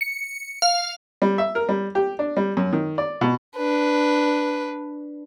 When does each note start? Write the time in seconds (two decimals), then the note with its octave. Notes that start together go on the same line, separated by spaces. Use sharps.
0.01 C#7
0.62 F5
1.22 G3
1.38 E5
1.55 A#4
1.69 G3
1.95 G4
2.19 D4
2.37 G3
2.57 F#2
2.72 D#3
2.98 D5
3.21 B2
3.56 D4 B4